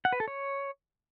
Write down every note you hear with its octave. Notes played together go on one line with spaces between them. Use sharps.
F#5
B4
A4
C#5